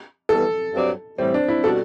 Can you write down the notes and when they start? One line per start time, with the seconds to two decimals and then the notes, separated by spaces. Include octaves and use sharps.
0.29 E3 G3 B3 A4
0.74 G2 F#3 C4 G4 D5
1.18 A2 E3 G3 C4
1.34 D4
1.48 E4
1.64 B2 G3 D4 F#4 A4